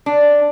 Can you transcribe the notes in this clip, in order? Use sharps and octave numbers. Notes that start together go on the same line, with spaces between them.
D4